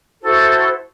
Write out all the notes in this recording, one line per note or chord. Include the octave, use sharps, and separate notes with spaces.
E4 F#4 A4 C5